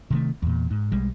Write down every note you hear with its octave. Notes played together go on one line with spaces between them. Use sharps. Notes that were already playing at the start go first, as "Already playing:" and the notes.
C3 D#3 A3
E2 A#2
G#2
B1 G3 G#3